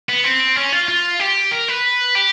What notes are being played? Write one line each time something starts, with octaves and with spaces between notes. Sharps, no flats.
B3
C4
C#4
F4
F4
G4
A#4
B4
G4